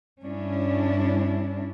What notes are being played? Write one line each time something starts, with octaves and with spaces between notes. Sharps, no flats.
G2 C#4 D4 E4